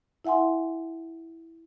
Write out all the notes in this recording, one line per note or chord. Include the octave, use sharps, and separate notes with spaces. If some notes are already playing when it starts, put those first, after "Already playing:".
E4 E5 F#5 G#5 C6